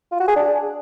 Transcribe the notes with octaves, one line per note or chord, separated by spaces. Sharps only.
F4
F#4
G#4
D4